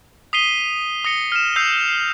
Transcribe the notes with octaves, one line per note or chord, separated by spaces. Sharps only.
D#6 B6 C7 D#7 G7
D#6 A#6 C#7 G7
F6 E7
E6 G6 C7 F7
C7